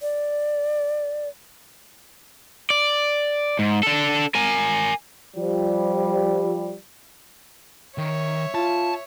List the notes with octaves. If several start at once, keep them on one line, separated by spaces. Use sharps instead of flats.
D5
D5
G#2
D4 A4
A#4 G#5
F3 G3
D#3 C#5 E5
F4 A5